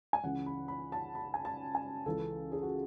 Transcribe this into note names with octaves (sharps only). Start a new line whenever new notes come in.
G#5
C#2 C#3 E3 F#5
B5
B5
A5
B5
G#5
A5
G#5
C#2 C#3 E3 A4
G#4
F#4